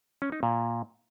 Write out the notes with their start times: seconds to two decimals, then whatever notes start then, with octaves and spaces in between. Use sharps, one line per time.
0.22 C#4
0.32 D#4
0.43 A#2